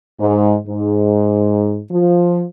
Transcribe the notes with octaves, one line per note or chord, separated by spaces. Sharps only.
G#2
G#2
F3